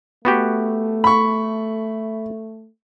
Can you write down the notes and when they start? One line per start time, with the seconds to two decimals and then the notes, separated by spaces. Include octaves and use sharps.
0.25 A3 B3 F#4 G4
1.04 B5 C#6